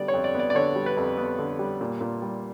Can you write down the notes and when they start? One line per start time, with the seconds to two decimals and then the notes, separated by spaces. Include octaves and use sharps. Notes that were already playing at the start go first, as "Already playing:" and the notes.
Already playing: D3 G3 B3 D5
0.08 C#5
0.14 F2
0.24 D5
0.35 B3 D5
0.50 D5
0.55 D3 C#5
0.76 G3
0.86 B4
0.97 F2
1.18 B3
1.39 D3
1.59 G3
1.81 A#2
2.01 A#2
2.22 G3